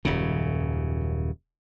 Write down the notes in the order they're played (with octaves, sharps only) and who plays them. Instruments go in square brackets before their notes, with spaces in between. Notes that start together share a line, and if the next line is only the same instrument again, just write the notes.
[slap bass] D#1 F#2 C#3